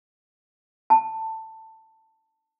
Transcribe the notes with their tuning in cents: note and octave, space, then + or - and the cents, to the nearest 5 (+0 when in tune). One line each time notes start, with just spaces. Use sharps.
A5 +15